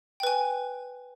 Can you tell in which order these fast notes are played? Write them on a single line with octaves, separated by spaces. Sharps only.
G5 B4 G#5